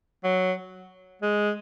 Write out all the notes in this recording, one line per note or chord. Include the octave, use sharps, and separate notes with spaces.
F#3
G#3